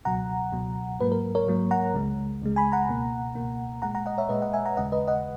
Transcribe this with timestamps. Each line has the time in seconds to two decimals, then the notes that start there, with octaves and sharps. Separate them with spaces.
0.05 C#2 B2 F#3 F#5 A#5
0.52 C#2 B2 F#3
1.00 G#2 F#3 A#3 B4
1.12 A#4
1.35 A#4 C#5
1.47 G#2 F#3 A#3
1.71 F#5 A#5
1.94 C#2 C#3 G#3
2.42 C#2 C#3 G#3
2.56 G#5 B5
2.72 F#5 A#5
2.88 C#2 B2 A#3
3.35 C#2 B2 A#3
3.82 A#2 G#3 F#5 A#5
3.95 F#5 A#5
4.06 D#5 F#5
4.18 C#5 E5
4.29 A#2 G#3 B4 D#5
4.42 D#5 F#5
4.53 E5 G#5
4.65 F#5 A#5
4.77 D#2 C#3 G#3 D#5 F#5
4.92 B4 D#5
5.07 D#5 F#5